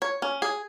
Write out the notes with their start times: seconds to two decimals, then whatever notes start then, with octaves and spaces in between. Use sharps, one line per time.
0.02 C#5
0.22 C#4
0.42 G#4